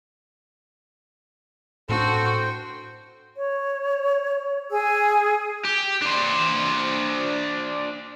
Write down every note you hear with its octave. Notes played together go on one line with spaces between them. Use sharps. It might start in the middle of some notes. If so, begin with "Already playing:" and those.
A2 C4 D4 F#4 A4 C5 G5
C#5
G#4 G#5 E6
G4
D4 C5